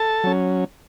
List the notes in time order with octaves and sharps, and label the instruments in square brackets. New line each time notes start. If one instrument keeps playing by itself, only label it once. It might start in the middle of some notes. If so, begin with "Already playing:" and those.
Already playing: [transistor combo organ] A4 A5
F#3 C#4